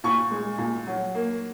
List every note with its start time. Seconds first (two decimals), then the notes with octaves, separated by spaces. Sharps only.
0.04 A#2 C#6
0.31 G#3
0.58 A#2
0.87 F#3
1.15 A#3